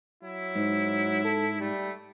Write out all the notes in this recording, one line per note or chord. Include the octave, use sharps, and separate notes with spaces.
F#3 E4
G#2
A4
G3 A3